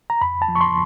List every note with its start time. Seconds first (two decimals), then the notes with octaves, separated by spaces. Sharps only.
0.10 A#5
0.21 F2 B5
0.42 A5
0.48 F3
0.55 C#6
0.61 C6